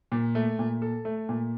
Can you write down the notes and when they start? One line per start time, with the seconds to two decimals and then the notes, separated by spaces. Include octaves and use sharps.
0.12 A#2
0.35 A3
0.59 A#2
0.82 A4
1.05 A3
1.29 A#2